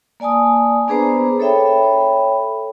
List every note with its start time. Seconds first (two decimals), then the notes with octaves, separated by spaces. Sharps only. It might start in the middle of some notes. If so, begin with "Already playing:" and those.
0.20 A#3 D5 G#5 A5 D#6
0.88 B3 D4 G#4 B4 C5 A#5
1.40 A4 C#5 E5 G5 B5